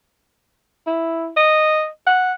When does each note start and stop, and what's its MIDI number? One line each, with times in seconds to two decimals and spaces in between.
0.87 1.29 64
1.37 1.88 75
2.07 2.33 78